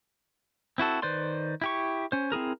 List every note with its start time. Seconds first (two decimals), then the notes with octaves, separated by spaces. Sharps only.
0.78 C4 E4 F#4 A4
1.02 D#3 B4 C5 D5 C6
1.61 E4 G4 C#6
2.12 C#4 C5
2.32 C4 E4 G#4 A#4